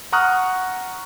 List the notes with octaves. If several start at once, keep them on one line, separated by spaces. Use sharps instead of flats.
F#5 A#5 C#6 D#6 F6 F#6